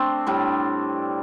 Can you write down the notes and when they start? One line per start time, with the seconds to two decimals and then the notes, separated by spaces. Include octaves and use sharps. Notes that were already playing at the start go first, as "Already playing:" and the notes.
Already playing: A3 C4 D4
0.27 A2 G3 D4